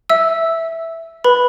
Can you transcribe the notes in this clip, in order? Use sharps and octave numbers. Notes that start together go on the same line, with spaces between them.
E5 E6
B4 B5